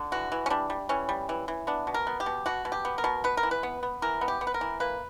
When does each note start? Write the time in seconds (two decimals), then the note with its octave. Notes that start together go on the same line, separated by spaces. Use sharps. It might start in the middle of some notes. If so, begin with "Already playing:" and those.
Already playing: D3
0.12 E3 F#4
0.32 E3
0.46 C#4
0.50 G3 D4
0.70 G3
0.89 E3 C#4
1.09 G3
1.29 E3
1.48 E3
1.67 B3 D4
1.87 B2
1.94 A#4
2.07 B3
2.20 G4
2.26 B2
2.46 B2 F#4
2.65 B2
2.72 G4
2.85 B3
2.98 A#4
3.04 B2
3.24 B3 B4
3.37 A#4
3.43 E3
3.51 B4
3.63 B3
3.83 B3
4.02 E3 A#4
4.21 B3
4.28 G4
4.41 B3
4.47 B4
4.54 A#4
4.61 E3
4.80 A#3 B4